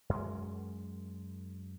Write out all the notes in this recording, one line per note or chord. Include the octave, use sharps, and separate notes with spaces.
F#2 G#3